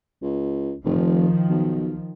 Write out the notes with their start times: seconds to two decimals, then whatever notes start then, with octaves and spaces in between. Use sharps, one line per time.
0.22 C#2
0.85 F1 D#3 F3
1.49 B1